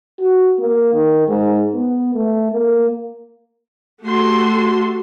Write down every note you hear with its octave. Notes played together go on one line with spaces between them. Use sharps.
F#4
A#3
D#3
G#2
B3
A3
A#3
A3 F#4 G4 A4 C6